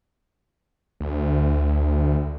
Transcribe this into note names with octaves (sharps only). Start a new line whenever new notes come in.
D2